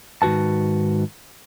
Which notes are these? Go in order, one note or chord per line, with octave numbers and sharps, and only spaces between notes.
G#2 D#3 F#4 B4 A5